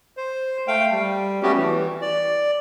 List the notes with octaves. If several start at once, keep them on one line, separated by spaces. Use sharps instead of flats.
C5
A3 F5 G5
G3
G3 A3 B3 C#4 F#4 G4
E3
D5